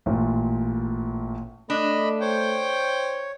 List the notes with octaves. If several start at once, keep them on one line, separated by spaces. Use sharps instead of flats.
A1 A#2
A3 D4 D#5 B5
C5 C#5 G5